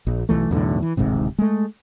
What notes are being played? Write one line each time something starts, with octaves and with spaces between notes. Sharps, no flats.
A#1
B1 F2 E3 A3
B1 E2 A2 D3
E3
D1 G#1 G#2 C3
G#3 A3